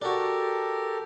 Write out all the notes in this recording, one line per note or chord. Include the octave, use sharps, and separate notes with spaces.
D4 F#4 G4 A4 A#4